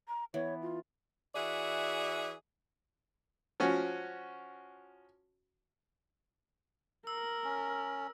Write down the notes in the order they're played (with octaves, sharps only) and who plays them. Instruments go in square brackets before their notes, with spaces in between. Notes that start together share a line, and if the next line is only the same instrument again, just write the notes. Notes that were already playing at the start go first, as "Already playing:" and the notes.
[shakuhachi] A#5
[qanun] E3 B3 [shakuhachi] C#5
[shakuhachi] F4
[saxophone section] E3 F#4 G#4 D5 E5
[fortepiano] F3 C#4 F#4
[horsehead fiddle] A#4 [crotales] E6
[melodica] C#4